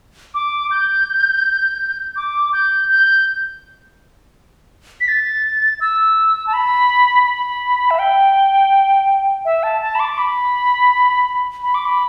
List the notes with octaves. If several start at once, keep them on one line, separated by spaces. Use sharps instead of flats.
D6
G6
D6
G6
G6
B6
A6
E6
A5
B5
B5
E5
G5
E5
A5
A5
B5
D6
B5
B5
D6
B5